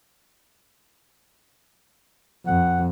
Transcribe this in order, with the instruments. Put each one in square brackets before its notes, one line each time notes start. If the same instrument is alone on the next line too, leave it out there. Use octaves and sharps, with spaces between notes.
[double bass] F2 [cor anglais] F#5